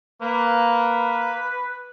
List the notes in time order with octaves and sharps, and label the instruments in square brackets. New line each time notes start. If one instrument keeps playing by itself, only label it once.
[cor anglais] A#3 [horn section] B4